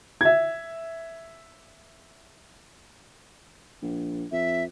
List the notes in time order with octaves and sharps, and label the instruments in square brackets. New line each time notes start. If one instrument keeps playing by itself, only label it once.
[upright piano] E5 G#6
[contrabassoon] A#1
[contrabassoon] F2 [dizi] E5